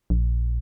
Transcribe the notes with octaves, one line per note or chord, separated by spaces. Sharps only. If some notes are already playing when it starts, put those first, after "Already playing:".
A#1